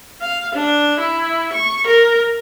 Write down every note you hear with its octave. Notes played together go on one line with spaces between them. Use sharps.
F5
D4
E4
C#6
A#4